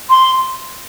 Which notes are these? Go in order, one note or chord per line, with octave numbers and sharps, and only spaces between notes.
C6